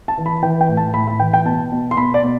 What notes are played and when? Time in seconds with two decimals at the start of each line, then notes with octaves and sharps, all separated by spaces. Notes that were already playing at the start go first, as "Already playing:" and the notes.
0.08 A5
0.18 E3
0.26 B5
0.43 E3 G5
0.61 G5
0.69 A2
0.77 A5
0.94 A2 B5
1.07 B5
1.20 E3 G5
1.34 G5
1.45 B2 A5
1.72 B2
1.91 C6
1.97 B2 B5
2.14 D5
2.23 B2